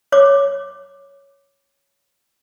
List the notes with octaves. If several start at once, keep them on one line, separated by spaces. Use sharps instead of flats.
C#5 D6